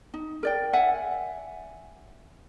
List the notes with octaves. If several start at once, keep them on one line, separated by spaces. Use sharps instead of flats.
D#4
A#4 D5 G5
E5 F#5 G#5